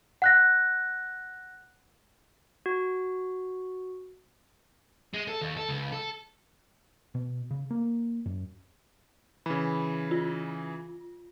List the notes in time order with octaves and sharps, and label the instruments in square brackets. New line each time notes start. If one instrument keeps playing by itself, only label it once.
[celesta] F#5 F#6 A#6
[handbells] F#4
[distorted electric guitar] G#3
A4
D#2
A4
C#2
A4
[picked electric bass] B2
C#3
A#3
F#2
[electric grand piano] C#3 E3 [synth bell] B5
[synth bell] F4